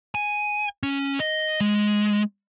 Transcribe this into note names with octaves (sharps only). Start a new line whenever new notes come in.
G#5
C#4
D#5
G#3